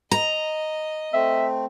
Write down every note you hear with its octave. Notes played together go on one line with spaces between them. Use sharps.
D#5 A#5
A3 C4 E5